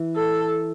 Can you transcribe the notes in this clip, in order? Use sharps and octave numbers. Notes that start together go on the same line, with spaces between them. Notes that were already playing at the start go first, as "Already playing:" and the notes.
Already playing: E3
A4